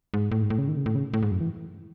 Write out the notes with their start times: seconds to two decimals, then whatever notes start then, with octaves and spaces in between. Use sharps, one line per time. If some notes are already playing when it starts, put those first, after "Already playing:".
0.14 G#2
0.32 A2
0.42 G#2
0.50 A2
0.58 C#3
0.68 D#3
0.77 C#3
0.86 A2
0.95 C#3
1.14 A2
1.23 G#2
1.31 F#2
1.41 E3